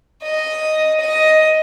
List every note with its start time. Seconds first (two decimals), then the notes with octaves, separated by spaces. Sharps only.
0.23 D#5
1.00 D#5